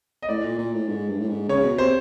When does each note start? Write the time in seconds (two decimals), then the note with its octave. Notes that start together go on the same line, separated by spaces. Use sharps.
0.22 D#5
0.29 A2 D5
0.43 A#2
0.58 A#2
0.73 A2
0.89 G#2
1.09 G2
1.19 A2
1.29 G#2
1.48 C#3 C#5
1.64 B2
1.78 C3 C5